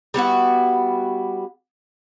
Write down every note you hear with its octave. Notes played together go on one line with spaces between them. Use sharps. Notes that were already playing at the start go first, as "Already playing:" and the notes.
G3 B3 E4 F#4